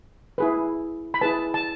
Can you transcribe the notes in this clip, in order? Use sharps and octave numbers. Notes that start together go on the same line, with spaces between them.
E4 G#4 B4
B5
E4 G#4 B4 A5
A5